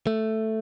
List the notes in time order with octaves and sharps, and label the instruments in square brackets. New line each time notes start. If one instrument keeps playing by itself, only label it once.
[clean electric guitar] A3